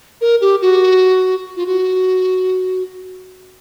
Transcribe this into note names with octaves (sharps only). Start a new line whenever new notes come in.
A#4
G4
F#4
F4
F#4